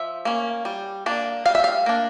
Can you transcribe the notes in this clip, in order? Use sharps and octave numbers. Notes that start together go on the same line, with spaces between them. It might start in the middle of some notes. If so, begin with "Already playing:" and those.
Already playing: F3 E5
A#3 C#4
G3
A#3 D4
G3 F5
E5
F5
A#3 D4